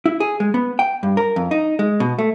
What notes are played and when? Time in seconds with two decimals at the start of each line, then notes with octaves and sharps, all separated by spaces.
0.06 E4
0.20 G#4
0.40 G#3
0.54 B3
0.79 G5
1.03 G2
1.17 A#4
1.36 F2
1.51 D#4
1.79 G#3
2.00 B2
2.18 A3